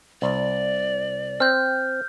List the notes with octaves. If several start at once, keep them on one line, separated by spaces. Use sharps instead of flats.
C2 D5
C4 F6 G6